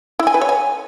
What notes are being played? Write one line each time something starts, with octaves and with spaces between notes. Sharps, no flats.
E4
G#5
B4
C#5
G#5